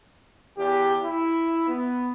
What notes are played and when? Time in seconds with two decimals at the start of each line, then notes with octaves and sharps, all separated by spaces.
0.57 E2 G4
1.03 E4
1.67 B3